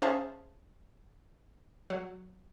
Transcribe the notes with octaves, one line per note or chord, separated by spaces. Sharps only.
C#4 G#4 C5 E5 F5 A5
F#3